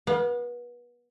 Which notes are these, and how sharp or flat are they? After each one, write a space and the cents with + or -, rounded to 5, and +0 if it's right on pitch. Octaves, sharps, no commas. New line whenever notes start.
B3 -30 F5 +20